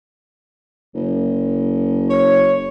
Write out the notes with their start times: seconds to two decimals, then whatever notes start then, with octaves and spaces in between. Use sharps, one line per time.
0.95 F#1
2.09 C#5